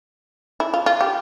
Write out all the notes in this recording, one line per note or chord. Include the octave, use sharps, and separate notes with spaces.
E4
F4
F4
G4